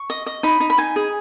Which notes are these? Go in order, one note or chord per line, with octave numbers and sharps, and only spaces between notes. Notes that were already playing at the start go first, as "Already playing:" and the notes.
Already playing: C#6
D#5
D#5
D#4 B5
D#4
B5
D#4 G#5
G#4